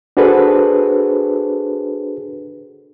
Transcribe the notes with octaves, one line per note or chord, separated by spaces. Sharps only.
D4 F#4 G#4 A4 B4 C5